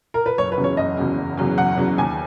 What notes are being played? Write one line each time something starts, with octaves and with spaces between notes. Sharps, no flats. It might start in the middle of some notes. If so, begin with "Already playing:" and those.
A#4
B4
F#1 C#5
B4
E2 C#3 F#3 C#4
C#5
F#1 D#5
E2 C#3 F#3 C#4
F#1
E2 C#3 F#3 C#4
F#1 F#5
E2 C#3 F#3 C#4
D#2 G#5